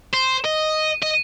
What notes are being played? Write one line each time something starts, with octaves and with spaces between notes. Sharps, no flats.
C5
D#5
D#5